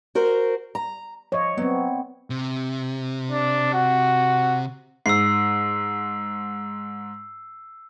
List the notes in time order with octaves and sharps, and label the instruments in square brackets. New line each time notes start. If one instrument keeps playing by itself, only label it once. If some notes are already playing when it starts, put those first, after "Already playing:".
[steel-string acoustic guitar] F#4 A#4 C5
A#5
[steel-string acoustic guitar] F3 [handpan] C#5 D#5
[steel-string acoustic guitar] F#3 [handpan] B3 C4
[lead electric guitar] C3
[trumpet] D4
F#4
[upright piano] G#2 [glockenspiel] E6 C7